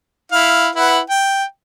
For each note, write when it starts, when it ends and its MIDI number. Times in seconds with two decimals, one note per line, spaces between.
0.32 0.68 64
0.32 0.68 77
0.75 0.99 64
0.75 0.99 71
0.75 0.99 78
1.10 1.44 79